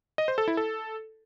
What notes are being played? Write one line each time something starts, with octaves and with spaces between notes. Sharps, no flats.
D#5
C5
A4
E4
A4